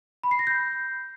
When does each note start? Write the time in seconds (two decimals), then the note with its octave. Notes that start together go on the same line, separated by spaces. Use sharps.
0.23 B5
0.31 C7
0.39 A#6
0.47 G6